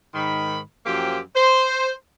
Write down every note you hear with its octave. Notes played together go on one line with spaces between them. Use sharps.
G#2 D#3 B5
F#2 F3 A#3 G4 C5 G5
C5